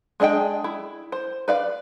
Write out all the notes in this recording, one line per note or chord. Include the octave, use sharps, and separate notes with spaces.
G#3 D4 G#4 D#5 G5
E4
C5
B4 D5 F5